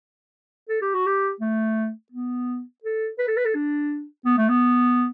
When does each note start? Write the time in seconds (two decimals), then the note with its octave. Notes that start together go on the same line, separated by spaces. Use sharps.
0.69 A4
0.82 G4
0.94 F#4
1.07 G4
1.41 A3
2.12 B3
2.83 A4
3.19 B4
3.28 A4
3.37 B4
3.45 A4
3.55 D4
4.25 B3
4.38 A3
4.49 B3